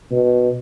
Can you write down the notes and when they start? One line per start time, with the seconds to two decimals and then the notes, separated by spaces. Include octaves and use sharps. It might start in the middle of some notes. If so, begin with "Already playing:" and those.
0.11 B2